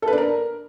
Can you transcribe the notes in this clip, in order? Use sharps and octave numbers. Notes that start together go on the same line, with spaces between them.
A4
B4
D4
A#4